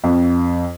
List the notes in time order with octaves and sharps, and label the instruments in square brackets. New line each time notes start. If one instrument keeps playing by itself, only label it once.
[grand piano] F2